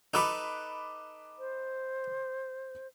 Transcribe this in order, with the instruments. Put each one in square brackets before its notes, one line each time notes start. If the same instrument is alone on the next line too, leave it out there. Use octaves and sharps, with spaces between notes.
[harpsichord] D#4 A4 B4 [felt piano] B5 D6 F#6
[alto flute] C5